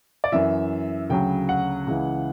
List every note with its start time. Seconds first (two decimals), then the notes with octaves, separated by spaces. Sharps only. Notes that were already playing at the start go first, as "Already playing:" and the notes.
0.24 D5
0.32 F#2 E3 E5
1.10 D2 C#3 F#3 G5
1.49 F#5
1.87 C#2 C#3 E3